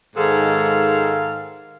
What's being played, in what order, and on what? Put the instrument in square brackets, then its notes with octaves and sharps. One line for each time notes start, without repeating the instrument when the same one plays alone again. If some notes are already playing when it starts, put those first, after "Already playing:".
[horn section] G#2 D#3 G#3 A4 F5